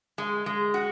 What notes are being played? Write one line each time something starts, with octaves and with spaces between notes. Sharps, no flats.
G#3
G#3
F#4